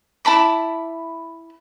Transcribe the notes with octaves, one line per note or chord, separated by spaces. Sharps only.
E4 A5 B5 D6